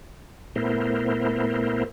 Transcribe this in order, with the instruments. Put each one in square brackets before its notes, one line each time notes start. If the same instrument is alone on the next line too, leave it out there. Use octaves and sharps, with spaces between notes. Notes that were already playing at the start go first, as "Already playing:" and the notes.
[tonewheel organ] A#2 A3 B3 E4 A#4 C5